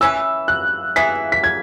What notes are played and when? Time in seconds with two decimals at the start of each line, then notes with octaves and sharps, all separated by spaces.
0.01 E3 C#4 E4 B4 E6
0.48 F#6
0.96 E3 G#3 B3 E4 B6
1.32 B6
1.44 G#6